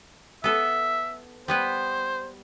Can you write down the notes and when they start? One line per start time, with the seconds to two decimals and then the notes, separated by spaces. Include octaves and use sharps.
0.44 B3 A4 E5
1.48 G3 B3 B4 C5